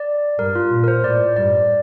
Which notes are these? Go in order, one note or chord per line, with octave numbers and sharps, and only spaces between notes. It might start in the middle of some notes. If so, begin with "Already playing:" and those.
Already playing: D5
G2 A#4
F4
A#2
A#4
C5
A2 D5
G2 D5